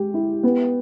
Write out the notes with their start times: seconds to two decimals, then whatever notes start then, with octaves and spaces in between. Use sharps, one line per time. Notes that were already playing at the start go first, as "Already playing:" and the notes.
Already playing: G#3 G4
0.14 E4
0.43 B3